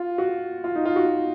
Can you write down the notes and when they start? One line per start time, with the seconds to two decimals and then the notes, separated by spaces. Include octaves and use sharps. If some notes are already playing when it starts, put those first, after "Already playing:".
Already playing: F4
0.18 F#4
0.64 F4
0.75 D#4
0.85 F4
0.96 F#4